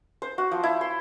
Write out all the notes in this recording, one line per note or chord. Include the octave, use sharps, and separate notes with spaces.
C5
F#4
F3
E4
C6